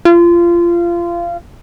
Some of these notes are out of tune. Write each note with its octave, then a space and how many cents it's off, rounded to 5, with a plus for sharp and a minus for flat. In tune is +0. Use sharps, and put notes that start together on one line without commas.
F4 -25